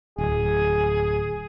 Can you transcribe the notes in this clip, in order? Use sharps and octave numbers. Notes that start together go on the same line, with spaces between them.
D1 G#4